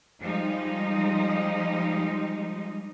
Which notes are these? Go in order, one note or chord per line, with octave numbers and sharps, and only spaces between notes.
F3 G3 G#3 D#4